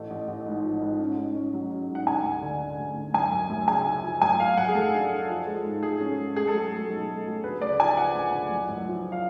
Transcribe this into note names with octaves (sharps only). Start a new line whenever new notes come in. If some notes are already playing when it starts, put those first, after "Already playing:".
Already playing: A1 A3
A1
A1
G#2
F3
G#2
C#4
G#2
C#4
F#3
C#4
G#2
F#5
D2 G#5
D2
D3
D3
D2
D2
F#2 G#5
F#2
F#2
C#3 G#5
C#3
F3
F#2 G#5
F#2 F5
F#2 F#5
G#4
F#2 A4
D4
D4
F3
G#3
G#2
G#3 G#4
C#4
G#3
A3 G#4
A4
F#3 G#4
A3
B1
A3
F#3
D2 B4
C#3 D5
F3 G#5
F3 F#5
D2
D2
F#1
F#2
F3
F5